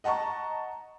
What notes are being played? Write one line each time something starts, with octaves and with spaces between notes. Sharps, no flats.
D#5 F#5 A5 A#5 C#6